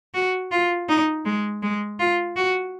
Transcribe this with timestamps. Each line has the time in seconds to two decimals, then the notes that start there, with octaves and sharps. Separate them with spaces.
0.14 F#4
0.52 F4
0.89 D#4
1.25 G#3
1.62 G#3
1.99 F4
2.36 F#4